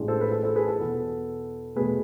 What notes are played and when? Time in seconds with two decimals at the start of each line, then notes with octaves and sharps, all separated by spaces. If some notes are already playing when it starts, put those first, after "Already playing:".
Already playing: A1 A2 E3 G#3 D4
0.08 A4 C5
0.21 B4
0.31 A4
0.43 A4 C5
0.56 G#4 B4
0.68 A4
0.79 E2 B2 B3
1.76 E2 B2 A3 G#4 B4